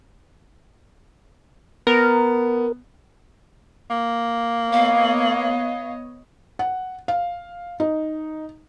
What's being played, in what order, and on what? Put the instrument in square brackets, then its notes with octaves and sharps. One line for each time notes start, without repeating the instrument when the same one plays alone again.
[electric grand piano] B3 [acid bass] A#4
[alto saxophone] A#3
[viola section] B3 C#5 D#5 [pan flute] F5
[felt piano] F#5
F5
D#4